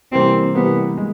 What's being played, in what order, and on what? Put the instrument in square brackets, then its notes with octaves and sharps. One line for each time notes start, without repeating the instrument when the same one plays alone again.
[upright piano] C3 E3 G3 A#3 [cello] C4
[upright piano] C3 E3 G3 A#3 [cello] B3
[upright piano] G#3